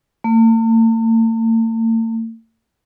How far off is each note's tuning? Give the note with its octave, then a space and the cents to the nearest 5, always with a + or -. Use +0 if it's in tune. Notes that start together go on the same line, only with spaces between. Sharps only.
A3 +45